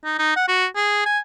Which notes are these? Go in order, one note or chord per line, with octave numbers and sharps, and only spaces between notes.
D#4
D#4
F#5
F#4
G#4
G#5